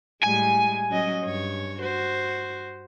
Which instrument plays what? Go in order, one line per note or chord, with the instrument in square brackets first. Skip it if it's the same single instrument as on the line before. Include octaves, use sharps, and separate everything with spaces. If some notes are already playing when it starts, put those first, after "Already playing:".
[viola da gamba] A2 G3 G#3 [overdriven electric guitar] G#5
[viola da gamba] F#3 C#4 D#5
G2 C#5
F#4 C5